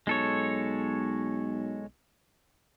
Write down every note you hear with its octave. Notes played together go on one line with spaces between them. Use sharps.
B1 G#3 A4 C#5